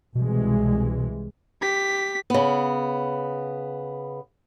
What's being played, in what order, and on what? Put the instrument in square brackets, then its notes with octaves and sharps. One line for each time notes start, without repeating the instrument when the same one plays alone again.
[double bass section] C2 E3 G#3 [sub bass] B2
[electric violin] G4 B6
[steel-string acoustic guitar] C#3 B3